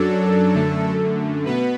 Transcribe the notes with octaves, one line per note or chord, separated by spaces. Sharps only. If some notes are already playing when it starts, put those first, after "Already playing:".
Already playing: F#2 F#3 D4 A4
F#2 D3 A3
B2 B3 B4